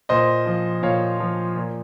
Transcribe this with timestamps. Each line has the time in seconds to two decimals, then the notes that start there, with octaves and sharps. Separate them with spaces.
0.09 A#2 C5 D#5
0.46 F3
0.83 A#2 C#5 F5
1.20 F3
1.56 A#2